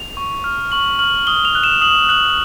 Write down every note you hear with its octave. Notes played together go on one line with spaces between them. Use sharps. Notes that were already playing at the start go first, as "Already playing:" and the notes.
Already playing: F7
C#6
F6
C#6 F#7
F6 F#7
D#6 G7
F7
F#6
E7
D#6 F#7
F#6 F#7